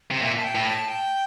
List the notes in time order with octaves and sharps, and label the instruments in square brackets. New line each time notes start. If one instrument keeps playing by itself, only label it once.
[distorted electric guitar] C3
[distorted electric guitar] A#2 [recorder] E5
[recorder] A5
G5
[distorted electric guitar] A2
[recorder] A5
G5